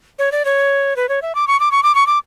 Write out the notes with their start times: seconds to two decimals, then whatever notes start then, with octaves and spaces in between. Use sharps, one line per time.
0.19 C#5
0.32 D5
0.45 C#5
0.96 B4
1.09 C#5
1.22 E5
1.35 D6
1.47 C#6
1.60 D6
1.71 C#6
1.83 D6
1.95 C#6
2.07 D6